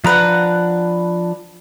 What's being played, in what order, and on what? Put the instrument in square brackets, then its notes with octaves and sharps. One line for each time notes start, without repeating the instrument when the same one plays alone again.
[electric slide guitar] F3 A#5 [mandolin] D4 B4 F#5